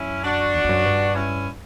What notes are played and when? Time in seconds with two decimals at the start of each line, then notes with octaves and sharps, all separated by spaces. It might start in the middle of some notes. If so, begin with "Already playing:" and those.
Already playing: F#2 C#4 E4
0.24 D4 F#4
0.54 E2
0.64 E2
0.69 F#2
0.85 G2
1.15 C#4 E4